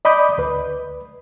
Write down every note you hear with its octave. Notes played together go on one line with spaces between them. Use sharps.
D5 D#5 B5 D6 D#6 G6
D2 B4